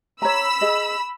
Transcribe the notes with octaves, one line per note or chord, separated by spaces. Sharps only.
C#5 A#5 B5 E6
G#4 D#5